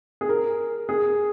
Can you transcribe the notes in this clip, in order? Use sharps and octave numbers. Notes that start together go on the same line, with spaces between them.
G#4
A#4
G#4